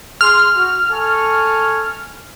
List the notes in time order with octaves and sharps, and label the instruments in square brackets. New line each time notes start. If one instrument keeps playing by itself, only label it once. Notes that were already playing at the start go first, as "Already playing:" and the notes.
[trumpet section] G#4 C6 [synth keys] F6
[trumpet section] F#4
A4 G#5 C#6